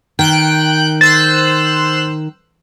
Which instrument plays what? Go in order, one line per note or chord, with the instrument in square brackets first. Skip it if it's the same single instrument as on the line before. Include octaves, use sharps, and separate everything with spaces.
[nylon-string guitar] D#3 [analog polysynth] G5 F#6 D7
[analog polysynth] C5 E6 F#6 [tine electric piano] A6